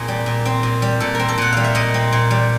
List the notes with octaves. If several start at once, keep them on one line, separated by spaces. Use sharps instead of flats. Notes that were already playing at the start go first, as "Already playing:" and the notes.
Already playing: A#2 C4 G#4
G3
A#2
C4
A#2
G3
A#2 A4
C4 A#4
A4
A#2 F#5
G3 F5
E5
A#2 D#5
C4
A#2
G3